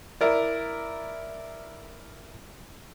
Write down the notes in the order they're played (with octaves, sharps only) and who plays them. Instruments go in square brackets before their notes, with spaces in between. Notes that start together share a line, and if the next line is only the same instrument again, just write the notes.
[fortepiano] E4 A#4 D5